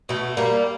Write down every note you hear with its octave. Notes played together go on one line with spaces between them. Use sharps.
B2 A3
G3 A#3